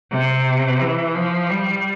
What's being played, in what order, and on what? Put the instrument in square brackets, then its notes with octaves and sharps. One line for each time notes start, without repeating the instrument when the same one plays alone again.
[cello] C3
E3
F3
G3